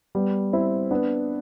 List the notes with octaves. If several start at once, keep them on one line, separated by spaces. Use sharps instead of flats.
G3 B3
C4 E4
B3 D4